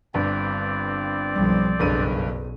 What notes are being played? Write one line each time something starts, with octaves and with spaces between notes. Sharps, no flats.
G1 G2 C4 D5
B1 F3 G3
F#1 B1 G2 G#4 A4 B4 D#7